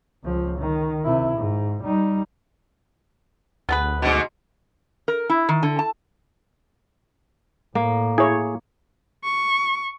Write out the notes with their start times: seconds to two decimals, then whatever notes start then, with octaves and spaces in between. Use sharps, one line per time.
0.24 C#2 F3
0.59 D#3
1.04 C3 E4
1.37 G#2
1.83 G3 D#4
3.69 D2 B3 G#4 B4
4.02 G#2 B2
5.08 A#4
5.29 E4
5.49 D#3
5.63 D3
5.79 A5
7.75 A2 A#3
8.18 E4 G#4 C#5
9.24 C#6